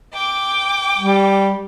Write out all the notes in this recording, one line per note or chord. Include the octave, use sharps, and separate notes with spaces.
G5 D6
G3